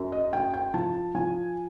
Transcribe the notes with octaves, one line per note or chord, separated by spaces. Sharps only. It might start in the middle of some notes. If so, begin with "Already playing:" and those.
Already playing: F#2
D#5
F#2 G5
G5
F3 A5
F3 G#5